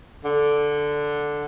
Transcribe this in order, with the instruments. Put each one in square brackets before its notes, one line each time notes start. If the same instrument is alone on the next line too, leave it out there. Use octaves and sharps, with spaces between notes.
[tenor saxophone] D3